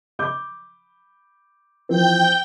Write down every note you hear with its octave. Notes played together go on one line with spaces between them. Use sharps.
B5 D6 G6
E3 F3 C4 G5 G6